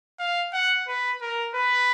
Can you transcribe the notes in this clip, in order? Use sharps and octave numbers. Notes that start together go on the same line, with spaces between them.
F5
F#5
B4
A#4
B4